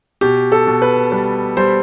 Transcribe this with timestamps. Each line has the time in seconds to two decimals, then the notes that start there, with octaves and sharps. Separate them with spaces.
0.21 B2 G4
0.52 A4
0.67 B2
0.82 B4
1.12 G3 B4
1.57 G3 C5